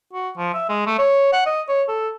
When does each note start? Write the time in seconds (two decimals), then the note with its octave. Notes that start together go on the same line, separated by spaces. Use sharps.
0.13 F#4
0.37 F3
0.54 E5
0.69 G#3
0.86 A3
0.99 C#5
1.33 F#5
1.46 D#5
1.68 C#5
1.88 A4